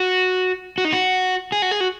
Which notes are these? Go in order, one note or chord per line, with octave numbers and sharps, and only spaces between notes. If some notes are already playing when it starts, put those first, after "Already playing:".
Already playing: F#4
F#4
D#4
F#4
G#4
F#4
G#4
F#4